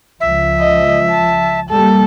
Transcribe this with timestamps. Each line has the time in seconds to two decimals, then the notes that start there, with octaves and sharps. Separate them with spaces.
0.20 C#2 F3 E5
0.59 D#5
1.10 A5
1.69 G3 A#3 A4